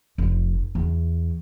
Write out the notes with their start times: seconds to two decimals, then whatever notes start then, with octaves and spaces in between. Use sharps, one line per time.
0.18 F1
0.75 E2